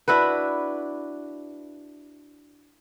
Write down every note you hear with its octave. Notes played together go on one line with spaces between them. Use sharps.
D4 E4 F#4 B4